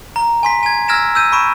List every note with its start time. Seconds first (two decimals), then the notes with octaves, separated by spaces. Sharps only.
0.16 A#5
0.43 G#5 C6 B6
0.63 G#5 G#6
0.88 E6 F6 G#6 A#6 D7 E7
1.15 E6 G6 D#7
1.32 B5 C#6 D7 E7